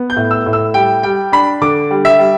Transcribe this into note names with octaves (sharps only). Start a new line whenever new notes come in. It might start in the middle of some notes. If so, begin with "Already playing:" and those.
Already playing: B3
G6
A2
E6
A2
E6
G3 G5
G3 G5
D4 B5
D3 D6
G3
E5
G3